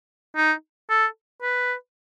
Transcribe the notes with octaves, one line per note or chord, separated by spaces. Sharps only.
D#4
A4
B4